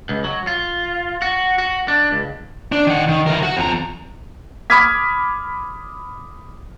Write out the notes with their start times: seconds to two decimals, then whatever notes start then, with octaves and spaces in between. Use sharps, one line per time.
0.09 C#2
0.24 F#3
0.47 F4
1.22 F#4
1.58 F#4
1.88 D4
2.11 C#2
2.72 D4
2.87 D#3 F#5
3.09 D#3
3.27 E3 A#4
3.43 F#4
3.57 F2 A#5
4.70 B5 D6 D#6 F6 G#6 B6